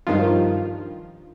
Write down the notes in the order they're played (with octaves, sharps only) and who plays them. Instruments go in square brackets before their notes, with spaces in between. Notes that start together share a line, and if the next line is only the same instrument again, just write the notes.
[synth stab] G2 D#3 F3 F4